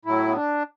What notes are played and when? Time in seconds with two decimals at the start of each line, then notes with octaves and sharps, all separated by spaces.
0.05 A2 F#3 E4
0.28 B3
0.36 D4